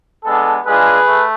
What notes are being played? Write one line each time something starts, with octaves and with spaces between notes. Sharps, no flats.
G#3 B3 D4 A4
G#3 D4 F4 G#4 B4
A3